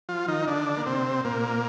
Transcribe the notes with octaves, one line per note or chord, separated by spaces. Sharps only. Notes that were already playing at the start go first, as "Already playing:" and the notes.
F3 F4
D#3 D#4
D3 D4
A#3
C3 C4
A#2 A#3